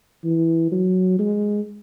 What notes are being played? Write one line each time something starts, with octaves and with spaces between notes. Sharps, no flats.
E3
F#3
G#3